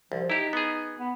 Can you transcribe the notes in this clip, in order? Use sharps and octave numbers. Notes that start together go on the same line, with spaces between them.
C2 F3
D#4 E4 G4
B3 G#4
B3